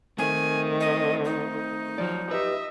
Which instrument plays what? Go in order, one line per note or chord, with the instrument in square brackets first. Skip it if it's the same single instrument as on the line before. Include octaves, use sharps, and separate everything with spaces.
[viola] D#3 [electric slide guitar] A3 C4 [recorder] G#5
[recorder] D#5
D#4
[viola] F3 [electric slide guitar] F#3 D5
[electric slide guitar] G4 B4 [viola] D#5 E5